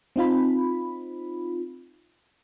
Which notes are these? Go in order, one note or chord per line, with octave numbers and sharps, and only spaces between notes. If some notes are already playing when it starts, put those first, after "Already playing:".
C4 D#4 F4 B5